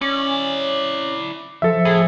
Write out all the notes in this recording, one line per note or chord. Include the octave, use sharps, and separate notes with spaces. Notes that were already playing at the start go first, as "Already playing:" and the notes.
C#4 E4 D5
F3 A4 E5
A2 G#4